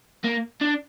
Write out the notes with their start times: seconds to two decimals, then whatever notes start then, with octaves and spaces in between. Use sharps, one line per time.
0.24 A#3
0.61 D4